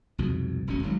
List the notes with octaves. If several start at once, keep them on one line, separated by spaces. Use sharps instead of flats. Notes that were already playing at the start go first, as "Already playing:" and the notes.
C2 F2 G#2 B2
D#1 G#1 B2 C#4
G#1 G#2 F#3